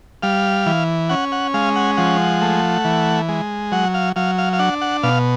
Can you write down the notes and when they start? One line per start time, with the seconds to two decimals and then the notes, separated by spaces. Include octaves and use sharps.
0.23 G3 F5
0.66 E3
1.09 C#4 F#5
1.32 F#5
1.54 G#3 F5
1.76 F#5
1.97 F3 F#5
2.42 A3
2.85 E3
3.29 G#3
3.72 F#3 F#5
3.94 F5
4.16 F#3 F5
4.38 F5
4.53 F5
4.59 D4 F#5
4.81 F#5
5.03 B2 F5